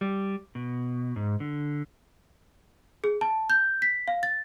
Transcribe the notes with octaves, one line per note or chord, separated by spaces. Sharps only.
G3
B2
G#2
D3
G#4
A5
G6
B6
F5
A6